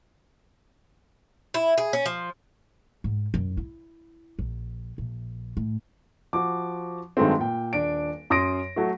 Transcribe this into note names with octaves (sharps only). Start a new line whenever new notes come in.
E4
G#4
C#4
F3
G#2
F#2
E4
A#1
A#1
A2
F3 F#4 D6
G2 D#3 F#3 G#3 A3 C4
A#2 G5
D#1 D4 D7
F#2 C6 D#6 A#6 D7
F#3 A3 F#4